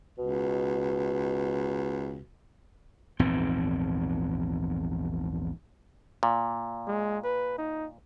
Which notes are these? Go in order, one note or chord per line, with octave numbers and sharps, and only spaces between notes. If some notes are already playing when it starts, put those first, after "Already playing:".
C#2 B2
A#1 E2 G#2 C4
A#2
G#3
B4
D#4